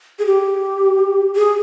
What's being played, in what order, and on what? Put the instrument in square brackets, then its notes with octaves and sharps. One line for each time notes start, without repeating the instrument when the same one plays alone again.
[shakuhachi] G#4
G4
G#4